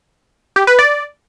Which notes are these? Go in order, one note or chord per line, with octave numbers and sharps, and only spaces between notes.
G4
B4
D5